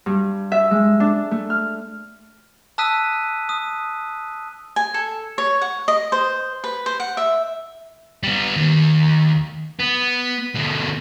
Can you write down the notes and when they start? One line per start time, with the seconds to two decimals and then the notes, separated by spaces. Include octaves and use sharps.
0.06 G2
0.52 E5
0.71 G#3
1.00 D4
1.31 A3
1.50 F6
2.78 A5 D#6 E6 F#6 B6 D#7
3.49 D#6
4.76 G#5
4.94 A4
5.38 C#5
5.61 F#5
5.88 D#5
6.12 C5
6.64 B4
6.86 C5
7.00 F#5
7.17 E5
8.23 G3 B3
8.56 D#2 D#3
9.79 B3
10.55 B2 D3